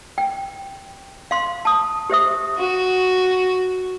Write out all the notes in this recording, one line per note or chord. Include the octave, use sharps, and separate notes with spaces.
G5
F5 C6
A5 D#6
G4 C5 E5 D#6
F#4